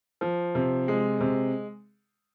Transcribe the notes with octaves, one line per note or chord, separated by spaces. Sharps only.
F3
C3
G#3
C3